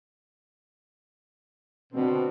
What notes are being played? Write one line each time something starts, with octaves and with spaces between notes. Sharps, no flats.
B2 D3 C4 D4